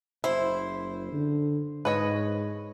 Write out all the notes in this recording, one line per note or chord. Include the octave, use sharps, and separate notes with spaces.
F#1 E4 C5
D3
G#2 B4 C#5 D#5